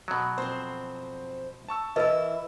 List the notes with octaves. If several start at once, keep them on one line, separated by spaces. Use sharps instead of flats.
B2 F#3
F2 C4 C5
A5 C#6 E6
E3 E4 A#4 B4 D#5